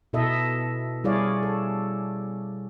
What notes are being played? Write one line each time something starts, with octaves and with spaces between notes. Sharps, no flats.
B2 E4 A4 D#5 E5
G3 E4 G#4 C#5 D5 F5
A4